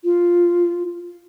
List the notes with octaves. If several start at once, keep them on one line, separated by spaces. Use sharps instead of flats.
F4